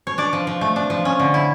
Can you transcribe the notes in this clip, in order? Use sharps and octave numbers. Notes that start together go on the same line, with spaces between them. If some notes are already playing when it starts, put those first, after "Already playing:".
C#5
D4 D5
F3
F3
A3
D4
F3
C#4
D3
E4